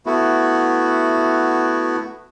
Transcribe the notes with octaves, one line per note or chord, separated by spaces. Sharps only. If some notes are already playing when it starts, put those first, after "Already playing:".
A3 B3 E4 F#4